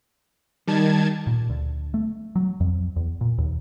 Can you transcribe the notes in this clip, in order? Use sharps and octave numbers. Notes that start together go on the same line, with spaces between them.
D#3 G3 A5 G#6
A#2
D2
A3
F#3
F2
E2
A#2
D#2